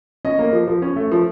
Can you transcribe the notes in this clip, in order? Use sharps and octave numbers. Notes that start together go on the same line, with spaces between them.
C#4 D#5
A#3
F3
F3
C#4
A3
F3